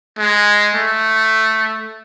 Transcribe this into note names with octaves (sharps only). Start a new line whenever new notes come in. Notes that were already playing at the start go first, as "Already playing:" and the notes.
G#3
A3